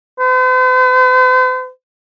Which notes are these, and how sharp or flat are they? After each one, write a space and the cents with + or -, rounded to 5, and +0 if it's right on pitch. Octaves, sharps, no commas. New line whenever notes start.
C5 -45